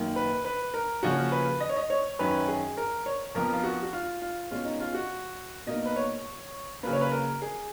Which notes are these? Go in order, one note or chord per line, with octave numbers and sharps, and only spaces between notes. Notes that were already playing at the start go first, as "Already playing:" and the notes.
Already playing: F#2 D#3 A#3
B4
B4
A#4
C#3 F3 A#3 C#4 F#4
B4
D#5
C#5
D#5
C#5
F#2 D#3 F#3 C#4 B4
G#4
A#4
C#5
F2 F3 B3 A#4
F4
F#4
F#4
F4
F4
B2 G#3 C#4 F4
D#4
F4
F#4
B2 A#3 D#4 D#5
B4
C#5
C#3 F#3 A#3 B4
C#5
B4
A#4
G#4